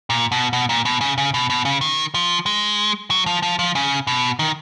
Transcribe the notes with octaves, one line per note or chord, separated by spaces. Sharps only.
A#2
B2
B2
A#2
B2
C#3
C#3
B2
B2
C#3
D#3
F3
G#3
F#3
F3
F3
F3
C#3
B2
D#3